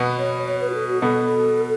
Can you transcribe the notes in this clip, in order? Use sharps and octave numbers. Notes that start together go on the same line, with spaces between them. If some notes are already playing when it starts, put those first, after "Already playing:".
Already playing: B2 B3
C#5
C#5
B4
F#4
A4
F#4
B2 B3 A4